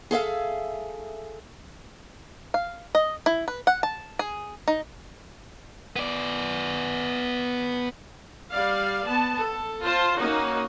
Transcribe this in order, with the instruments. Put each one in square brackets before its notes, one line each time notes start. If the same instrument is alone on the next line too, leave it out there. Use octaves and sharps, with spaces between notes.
[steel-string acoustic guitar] G#4 A4 E5 F5
[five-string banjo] F5
D#5
E4
B4
F#5
A5
G#4
D#4
[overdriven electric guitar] B3 D5
[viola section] G3 D5 F5
B3 A5
A4
F4 C5 A5
A#3 C#4 D#4 F#4